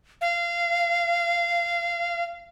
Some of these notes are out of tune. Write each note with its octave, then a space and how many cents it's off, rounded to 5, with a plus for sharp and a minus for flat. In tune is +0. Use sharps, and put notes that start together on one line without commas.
F5 -20